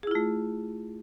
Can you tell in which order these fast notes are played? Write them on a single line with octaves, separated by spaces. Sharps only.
G#4 E4 F4 A3